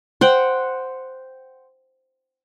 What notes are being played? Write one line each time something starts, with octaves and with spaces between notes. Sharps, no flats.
C5 F#5 G5